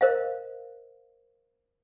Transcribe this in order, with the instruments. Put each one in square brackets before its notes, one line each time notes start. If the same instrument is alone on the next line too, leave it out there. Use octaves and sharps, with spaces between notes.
[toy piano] A#4 C5 D#5 F5